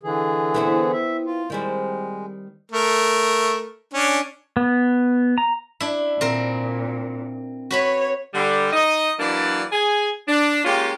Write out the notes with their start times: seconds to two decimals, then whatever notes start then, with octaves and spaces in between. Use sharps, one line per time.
0.03 D3 E3 G#4
0.54 B3 C4 E4
0.92 E5
1.26 F4
1.50 D#3 G3 G#3 C4
2.72 A3 A#4
3.94 C#4 D4
4.57 B3
5.38 A#5
5.80 D4 E4
6.21 A#2 C4 A#4
7.71 F#4 B4 C#5 B5
8.34 D3 G3
8.73 D#4 D#5
9.20 E3 F#3 A#3 D4 B4 D5
9.72 G#4 G#5
10.28 D4
10.64 G#3 A#3 C#4 F4 G4